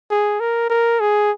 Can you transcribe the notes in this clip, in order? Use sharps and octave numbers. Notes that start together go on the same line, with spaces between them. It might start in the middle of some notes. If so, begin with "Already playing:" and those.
G#4
A#4
A#4
G#4